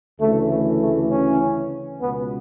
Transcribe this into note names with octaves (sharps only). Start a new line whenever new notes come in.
D2 C#3 E3 A3
A3
A3
C#4
C#2 B2 B3